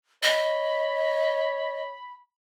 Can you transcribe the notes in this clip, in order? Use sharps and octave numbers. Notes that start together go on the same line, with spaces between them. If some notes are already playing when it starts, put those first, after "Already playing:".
C#5 D#5 B5